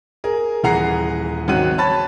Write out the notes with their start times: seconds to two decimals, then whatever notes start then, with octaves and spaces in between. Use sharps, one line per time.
0.24 G#4 A#4
0.63 D#1 E3 G#4 F#5 A#5 C7
1.48 G#1 C#3 F#3 F#5 F#6 D#7
1.78 C#5 A5 B5 A6